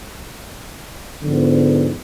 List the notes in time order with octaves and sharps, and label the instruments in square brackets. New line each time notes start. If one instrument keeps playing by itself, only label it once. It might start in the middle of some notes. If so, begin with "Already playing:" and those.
[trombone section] G#2 D3 F3 B3